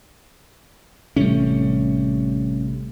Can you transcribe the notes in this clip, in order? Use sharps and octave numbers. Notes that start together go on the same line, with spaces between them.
A1 C3 G3 A3 C#4